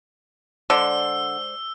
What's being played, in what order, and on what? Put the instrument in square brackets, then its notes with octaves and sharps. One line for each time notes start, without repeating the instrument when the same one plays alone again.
[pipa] D3 [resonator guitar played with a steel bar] G#3 C5 D5 [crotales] E6